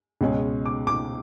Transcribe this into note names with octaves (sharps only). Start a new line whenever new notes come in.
C#2 B2 G#3 C#4
D6
D6